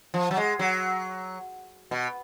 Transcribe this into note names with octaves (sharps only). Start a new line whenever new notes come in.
F3
F#3
G#3
F#3
B2